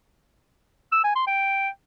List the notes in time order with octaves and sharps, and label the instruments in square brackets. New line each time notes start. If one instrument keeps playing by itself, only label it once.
[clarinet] E6
G#5
C6
G5